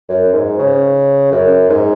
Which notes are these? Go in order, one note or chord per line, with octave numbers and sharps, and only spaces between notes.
F#2
G#2
C#3
F#2
G#2